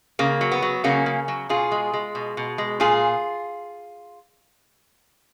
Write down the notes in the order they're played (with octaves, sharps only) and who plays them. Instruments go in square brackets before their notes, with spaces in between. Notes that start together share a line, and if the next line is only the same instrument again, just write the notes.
[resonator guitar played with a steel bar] C#3 A#3
F#3
B3
F#3
C#3 A#3 C#4
C#3
F#3
B2 F4 G#4
G#3
G#3
B2
B2
G#3
A#2 F4 G#4